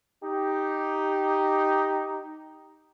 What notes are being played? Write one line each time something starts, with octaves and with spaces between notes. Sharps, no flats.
D#4 G4